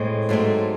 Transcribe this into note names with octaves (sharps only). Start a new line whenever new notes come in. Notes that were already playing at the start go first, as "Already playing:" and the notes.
Already playing: A2 G#3 C4 C5
G#2 F#3 A3 C4